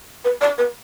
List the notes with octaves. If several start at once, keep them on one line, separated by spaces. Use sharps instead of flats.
B4
D5
B4